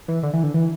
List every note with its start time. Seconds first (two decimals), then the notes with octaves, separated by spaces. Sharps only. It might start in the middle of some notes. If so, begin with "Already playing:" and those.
0.08 E3
0.23 D3
0.33 E3
0.43 D3
0.54 E3